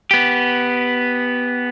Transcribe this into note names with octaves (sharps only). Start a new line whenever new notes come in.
B3 G4